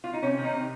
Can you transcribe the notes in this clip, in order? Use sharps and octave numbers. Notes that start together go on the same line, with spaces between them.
F4
D#4
C3 C#4
D#3
D#4
C3